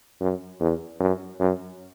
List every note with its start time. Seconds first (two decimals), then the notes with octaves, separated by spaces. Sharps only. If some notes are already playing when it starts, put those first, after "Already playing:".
0.21 F#2
0.60 E2
1.00 F#2
1.40 F#2